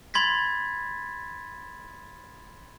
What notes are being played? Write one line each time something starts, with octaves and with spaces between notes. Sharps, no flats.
B5 C6 G#6 A6 B6